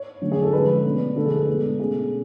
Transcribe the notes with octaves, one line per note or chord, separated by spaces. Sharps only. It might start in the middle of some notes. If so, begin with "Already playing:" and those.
Already playing: C#5
D3 F#3 A3 C#4
G#4
A4
D3 F3 G#3 C#4 B4
B2 A3 D4
D3 F3 A3 D4 A4
G#4
A4
B2 G#3 D4
B2 A3 C#4 G#4